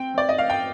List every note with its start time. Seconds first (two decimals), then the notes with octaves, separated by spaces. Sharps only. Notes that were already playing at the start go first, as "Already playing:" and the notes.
Already playing: C4 G5
0.14 C4 D5
0.29 D#5
0.38 F5
0.50 G5